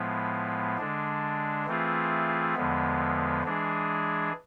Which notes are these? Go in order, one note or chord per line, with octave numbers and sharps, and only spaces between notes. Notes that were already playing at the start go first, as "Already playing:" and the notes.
Already playing: A2 F3 G#3 B3
D3 G#3 D4
E3 A3 C4 F4 G#4
E2 D3 F3 G#3 B3
E3 G#3 D4 G#4